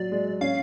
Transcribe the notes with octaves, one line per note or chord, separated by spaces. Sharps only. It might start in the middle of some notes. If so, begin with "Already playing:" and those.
Already playing: F#3 D5
G#3
C#4 F5